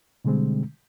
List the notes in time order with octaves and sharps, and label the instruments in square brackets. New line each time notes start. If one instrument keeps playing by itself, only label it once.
[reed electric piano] B2 D3 G3 G#3 C4